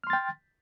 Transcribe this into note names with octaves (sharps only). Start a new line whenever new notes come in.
G5 C6 F6 A6